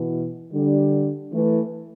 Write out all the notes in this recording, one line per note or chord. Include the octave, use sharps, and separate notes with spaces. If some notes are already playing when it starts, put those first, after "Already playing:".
Already playing: B2 E3
D3 G3
E3 A3